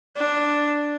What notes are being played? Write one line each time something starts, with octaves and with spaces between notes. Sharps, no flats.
D4